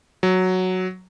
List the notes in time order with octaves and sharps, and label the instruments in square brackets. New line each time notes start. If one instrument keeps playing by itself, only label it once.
[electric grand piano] F#3